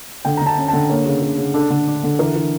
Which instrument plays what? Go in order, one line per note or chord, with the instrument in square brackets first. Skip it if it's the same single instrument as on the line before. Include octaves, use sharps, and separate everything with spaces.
[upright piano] D3 G5
D3 A#5
A5
C#4
D3 A5
A#3 C#5
C#3
C#3
C#3
D4 A4
D3
D4
D3
E3 A#4
E3